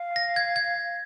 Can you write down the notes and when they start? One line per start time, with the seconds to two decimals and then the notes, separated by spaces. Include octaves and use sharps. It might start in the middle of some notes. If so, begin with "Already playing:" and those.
Already playing: F5
0.16 A#6
0.36 G#6
0.56 G#6